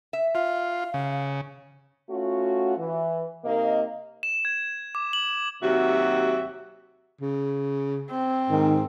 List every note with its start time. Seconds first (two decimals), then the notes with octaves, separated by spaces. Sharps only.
0.13 E5
0.35 F4 F5
0.94 C#3
2.10 A3 C#4 F4 F#4
2.78 E3
3.45 C3 A#3 D#4 A#4 D#5
4.23 E7
4.45 G#6
4.95 D6
5.13 F#7
5.62 D#2 C3 F#3 F#4 E5
7.21 C#3
8.10 C4
8.50 G#2 D#3